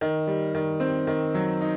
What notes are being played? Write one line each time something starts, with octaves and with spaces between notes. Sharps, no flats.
D#3
G3
D#3
C4
D#3
F#3
D#4